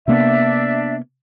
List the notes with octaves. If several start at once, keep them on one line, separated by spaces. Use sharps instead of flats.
C3 A#3 B3 D4 E5